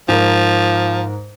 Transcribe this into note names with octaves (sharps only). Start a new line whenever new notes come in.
G#2 F3 A#4